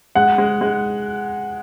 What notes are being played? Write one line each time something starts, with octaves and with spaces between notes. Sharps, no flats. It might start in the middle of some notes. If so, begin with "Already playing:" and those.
G#3 F#5
G#3
G#3